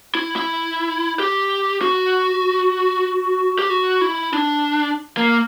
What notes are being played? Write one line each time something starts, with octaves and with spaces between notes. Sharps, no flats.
E4
E4
G4
F#4
G4
F#4
E4
D4
A#3